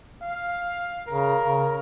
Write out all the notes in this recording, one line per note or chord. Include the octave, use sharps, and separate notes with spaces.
F5
C#3 A#4
C#3